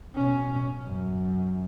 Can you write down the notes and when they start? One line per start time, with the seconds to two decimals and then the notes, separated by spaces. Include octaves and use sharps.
0.15 B2 C#4
0.87 F#2